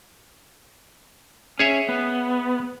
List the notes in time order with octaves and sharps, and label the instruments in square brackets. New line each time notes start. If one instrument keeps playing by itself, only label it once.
[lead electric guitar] C#4 [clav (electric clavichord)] G#4 C#5 E5
[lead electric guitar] B3